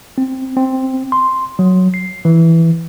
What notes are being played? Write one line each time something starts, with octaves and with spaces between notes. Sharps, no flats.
C4
C4
C6
F#3
C7
E3